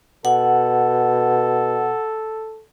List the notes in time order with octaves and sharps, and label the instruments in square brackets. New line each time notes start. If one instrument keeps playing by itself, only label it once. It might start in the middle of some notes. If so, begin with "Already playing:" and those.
[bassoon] B2 [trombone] A4 [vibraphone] F#5